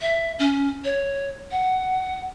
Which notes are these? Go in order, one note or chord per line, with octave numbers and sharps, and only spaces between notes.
E5
C#4
C#5
F#5